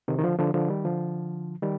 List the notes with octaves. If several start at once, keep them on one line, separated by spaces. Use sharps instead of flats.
C3 D#3
D#3
D3 F3
D3 F3
D3 F3
D#3 G3
D3 F3
D#3 G3